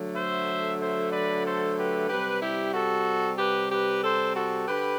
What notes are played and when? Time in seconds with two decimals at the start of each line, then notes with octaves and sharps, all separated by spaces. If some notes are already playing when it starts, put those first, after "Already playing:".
Already playing: D3 F#3 A3
0.15 C5 E5
0.80 C5 E5
1.12 B4 D5
1.44 A4 C5
1.77 G4 B4
2.09 C3 G3 G4 B4
2.41 E4 G4
2.74 F#4 A4
3.38 G4 B4
3.71 G4 B4
4.03 A4 C5
4.36 F#4 A4
4.68 D3 G4 B4